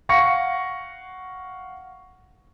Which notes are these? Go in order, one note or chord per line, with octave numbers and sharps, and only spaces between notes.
F5 F#5 C#6 A#6 C#7